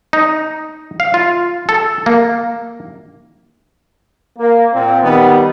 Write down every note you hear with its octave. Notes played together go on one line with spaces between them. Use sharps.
D#4
F5
F4
A4
A#3
A#3
A#2 C4
D#3 G3 B3